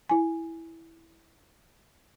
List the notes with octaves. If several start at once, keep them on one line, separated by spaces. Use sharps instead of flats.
E4 G#5